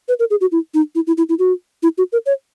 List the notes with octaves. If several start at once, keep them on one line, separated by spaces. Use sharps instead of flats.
B4
A#4
G#4
F#4
E4
D#4
E4
E4
E4
E4
F#4
E4
F#4
A#4
C#5